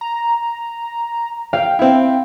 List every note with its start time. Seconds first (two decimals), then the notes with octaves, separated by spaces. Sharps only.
0.01 A#5
1.53 F5 G5
1.79 C4 E4